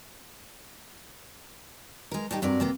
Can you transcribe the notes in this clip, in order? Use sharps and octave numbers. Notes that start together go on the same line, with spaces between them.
G#3 A#4
A2 G3 D#4 G4
G2 C3 F#3 A#4 D5
C3 A#3 B3